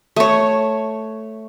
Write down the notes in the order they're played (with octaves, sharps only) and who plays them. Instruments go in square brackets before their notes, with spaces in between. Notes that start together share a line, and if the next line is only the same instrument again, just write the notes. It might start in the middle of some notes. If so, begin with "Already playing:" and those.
[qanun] A3 C#5